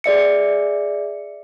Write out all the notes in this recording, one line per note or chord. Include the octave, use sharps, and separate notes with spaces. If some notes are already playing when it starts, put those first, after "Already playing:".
G#4 D5 E5 C#7